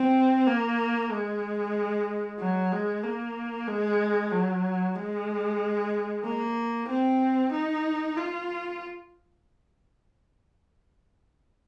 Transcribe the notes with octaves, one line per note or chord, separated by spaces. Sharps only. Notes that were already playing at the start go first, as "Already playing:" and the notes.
Already playing: C4
A#3
G#3
F#3
G#3
A#3
G#3
F#3
G#3
A#3
C4
D#4
F4